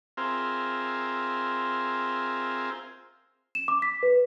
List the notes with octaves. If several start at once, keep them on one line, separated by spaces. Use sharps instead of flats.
C4 F4 G#4 A#4 C5 E5
E7
D6
B6
B4